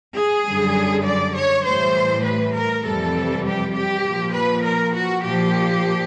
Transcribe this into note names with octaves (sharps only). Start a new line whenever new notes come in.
G#4
F#2 D3 G3
D5
C#5
A2 E3 G3 C5
B4
A#4
F2 C3 E3 G3 A4
G4
G4
A#2 F3
B4
A#4
F#4
A#2 F3 G4